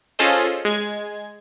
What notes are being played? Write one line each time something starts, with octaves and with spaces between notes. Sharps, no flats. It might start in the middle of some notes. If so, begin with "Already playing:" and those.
C#4 F4 G#4 A4 C5 D#5
G#3 G#6